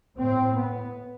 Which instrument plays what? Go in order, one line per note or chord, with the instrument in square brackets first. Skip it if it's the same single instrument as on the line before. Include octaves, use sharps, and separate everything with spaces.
[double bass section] A2 C4
B3